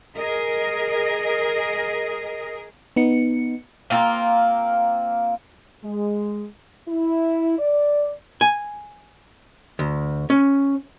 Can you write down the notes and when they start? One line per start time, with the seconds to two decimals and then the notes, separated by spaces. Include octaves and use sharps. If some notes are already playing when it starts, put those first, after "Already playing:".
0.16 G#4 A#4 D#5
2.96 B3 D#4 C#7
3.90 A#3 C4 F4
5.84 G#3
6.87 E4
7.59 D5
8.41 G#5
9.79 D2
10.30 C#4